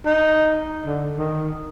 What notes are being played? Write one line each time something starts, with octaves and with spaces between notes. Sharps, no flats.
D#4
D3
D#3